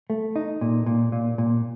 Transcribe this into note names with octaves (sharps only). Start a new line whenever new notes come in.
A3
D#4
A#2
A#2
A#2
A#2